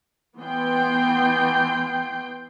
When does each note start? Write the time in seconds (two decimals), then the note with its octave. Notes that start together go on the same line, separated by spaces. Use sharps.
0.38 E3 B3 G5 C6